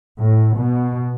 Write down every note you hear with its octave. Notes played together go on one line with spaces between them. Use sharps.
A2
B2